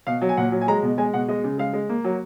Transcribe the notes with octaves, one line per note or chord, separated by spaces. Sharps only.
B2 F5
F#3
G#5
A#2 F#5
F#3
G#5
G#3 A#5
B2
G#3 G#5
B2 F#5
G#3 D#5
C#3
G#3 F5
G#3
A#3
F#3